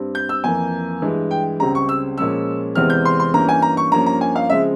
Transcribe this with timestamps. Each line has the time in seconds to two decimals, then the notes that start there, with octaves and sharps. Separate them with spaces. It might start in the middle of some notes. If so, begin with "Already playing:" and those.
Already playing: G2 G3 C4
0.15 G6
0.29 E6
0.44 F2 E3 A#3 G#5
1.02 G2 E3 G#3
1.31 G5
1.60 C#2 C#3 G3 C4 A#5
1.75 C#6
1.89 E6
2.18 A#2 F3 G#3 C#4 E6
2.75 E2 C3 E3 G#3 C4 F6
2.90 G6
3.05 C6
3.20 C6
3.34 G2 E3 A#3 C#4 A#5
3.49 G#5
3.62 A#5
3.77 C#6
3.92 G2 F3 A#3 C#4 A#5
4.06 A#5
4.21 G#5
4.36 F5
4.49 C#3 F3 G#3 C4 E5